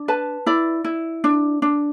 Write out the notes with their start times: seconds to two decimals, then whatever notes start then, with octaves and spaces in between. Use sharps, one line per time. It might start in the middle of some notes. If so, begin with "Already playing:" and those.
Already playing: D4
0.08 B4 A5
0.46 E4 D5
0.85 E4
1.24 D4
1.62 D4